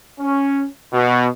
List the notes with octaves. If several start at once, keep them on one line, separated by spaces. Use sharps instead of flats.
C#4
B2